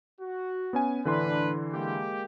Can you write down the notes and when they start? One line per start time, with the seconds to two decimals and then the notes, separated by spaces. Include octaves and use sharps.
0.20 F#4
0.73 B3 C#4 G#5
1.05 A2 D3 E3 D4 B4 C6
1.73 G#3 A#3 G4